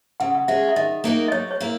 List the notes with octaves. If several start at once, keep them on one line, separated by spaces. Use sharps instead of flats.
C#3 F#5
F#5
G#3 C#4 G#4 E5
E5
D#3 D#5
A#3 D#4 F#4 A#4
D#5
F#3 C#5
C#5
A#3 E4 A#4